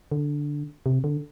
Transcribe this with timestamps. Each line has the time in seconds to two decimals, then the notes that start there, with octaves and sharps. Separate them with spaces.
0.12 D3
0.86 C3
1.04 D3